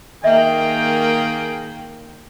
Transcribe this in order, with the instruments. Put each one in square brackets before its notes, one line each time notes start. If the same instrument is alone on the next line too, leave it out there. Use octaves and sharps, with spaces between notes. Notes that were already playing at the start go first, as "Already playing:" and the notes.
[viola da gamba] D#3 A#3 [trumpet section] G#4 G5 [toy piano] D#5 E5